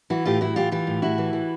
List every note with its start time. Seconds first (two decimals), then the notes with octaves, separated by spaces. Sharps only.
0.10 E3 E4 F#4
0.25 A2 F4 G4
0.41 A2 E4 F#4
0.56 E3 F4 G4
0.72 E3 F4 G4
0.87 A2
1.02 A2 E4 F#4
1.18 E3
1.33 E3